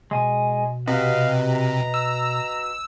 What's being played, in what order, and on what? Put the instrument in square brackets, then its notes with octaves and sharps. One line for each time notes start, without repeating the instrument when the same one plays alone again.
[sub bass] B2 [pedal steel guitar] G#3 G#5
[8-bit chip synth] C3 [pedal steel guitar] F#4 B4 D#5 [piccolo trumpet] F5
[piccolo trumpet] A#5
[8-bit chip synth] E6